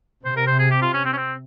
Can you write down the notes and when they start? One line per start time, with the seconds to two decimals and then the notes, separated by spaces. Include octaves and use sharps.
0.25 C3 C5
0.37 A#4
0.47 C5
0.59 G#4
0.71 G4
0.82 F4
0.94 C#4
1.05 C4
1.13 C#4
1.17 C4